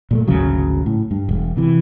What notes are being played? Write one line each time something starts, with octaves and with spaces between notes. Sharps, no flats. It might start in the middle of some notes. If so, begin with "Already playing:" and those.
A#2 G#3 A3
G#1 D2 C#3 F#3
A2
G2
E1
C3 E3